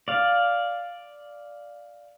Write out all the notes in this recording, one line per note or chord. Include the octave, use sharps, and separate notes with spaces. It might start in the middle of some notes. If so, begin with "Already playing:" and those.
D5 F5